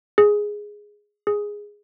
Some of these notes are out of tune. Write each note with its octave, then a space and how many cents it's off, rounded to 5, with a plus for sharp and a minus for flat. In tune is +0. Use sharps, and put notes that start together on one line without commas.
G#4 +0
G#4 -5